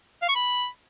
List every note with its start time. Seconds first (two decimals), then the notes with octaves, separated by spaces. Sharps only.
0.22 F5
0.29 C#6
0.35 B5